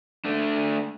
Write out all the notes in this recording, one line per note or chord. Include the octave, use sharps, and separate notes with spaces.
A3 D4